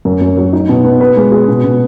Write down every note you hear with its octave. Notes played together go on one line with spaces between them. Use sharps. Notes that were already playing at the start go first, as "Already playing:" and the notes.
F#2
F#2
F#3
D#4
B2
B3
B4
G#3
G#4
B2
B2